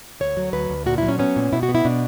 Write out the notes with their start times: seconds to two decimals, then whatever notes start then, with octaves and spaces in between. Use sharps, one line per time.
0.20 D2 C#5
0.37 F#3
0.53 D2 B4
0.70 D2
0.86 A#2 F#4
0.98 F#3 E4
1.08 C#4
1.19 B3 C#4
1.36 A#2
1.53 B2 E4
1.63 F#4
1.69 B3
1.75 E4
1.85 B2 D4